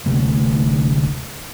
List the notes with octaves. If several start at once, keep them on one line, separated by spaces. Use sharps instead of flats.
D1 D2 C3 A3